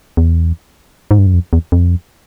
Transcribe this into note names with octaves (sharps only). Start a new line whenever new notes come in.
E2
G#2
G2
F#2
F2
E2
F2